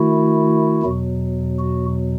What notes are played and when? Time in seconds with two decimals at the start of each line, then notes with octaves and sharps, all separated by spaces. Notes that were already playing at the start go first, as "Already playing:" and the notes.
Already playing: D#3 A3 E4 F#4
0.83 E2 B2 F#3
1.59 F#4